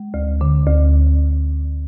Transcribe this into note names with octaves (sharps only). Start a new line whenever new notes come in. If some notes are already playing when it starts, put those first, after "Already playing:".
Already playing: G#3
D2
D3
D2